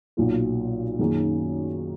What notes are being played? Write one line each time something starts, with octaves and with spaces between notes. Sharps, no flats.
B1 A#2 F#3 A#3 F4
F#2 D#3 A#3 C#4 G#4